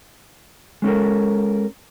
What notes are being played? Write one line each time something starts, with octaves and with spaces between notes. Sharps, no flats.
G#3 C#4 A4 A#4